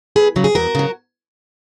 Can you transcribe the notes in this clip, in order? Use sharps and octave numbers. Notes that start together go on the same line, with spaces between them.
E2 G#4 B4
C#3 F#3
G#4
E2 F#4 A#4
C#3 F#3